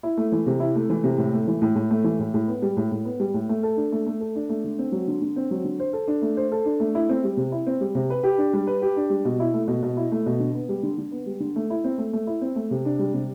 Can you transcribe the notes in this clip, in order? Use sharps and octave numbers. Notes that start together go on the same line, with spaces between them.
E4
A3
E3
C3
E4
A3
E3
C3
A2
A3
E3
A2
A2
A3
E3
A2
A2
B3
G3
A2
A2
B3
G3
A2
A3
A4
D4
A3
A3
A4
D4
A3
D3
C4
F#3
D3
D3
C4
F#3
D3
C5
A4
D4
A3
C5
A4
D4
A3
E4
C4
G3
C3
E4
C4
G3
C3
B4
G4
D4
G3
B4
G4
D4
G3
B2
E4
A3
B2
B2
E4
A3
B2
D3
B3
G3
D3
D3
B3
G3
D3
A3
E4
C4
A3
A3
E4
C4
A3
C3
D4
G3
C3